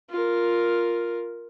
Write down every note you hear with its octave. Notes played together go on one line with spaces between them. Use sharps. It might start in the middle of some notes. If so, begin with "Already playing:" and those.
F4 A#4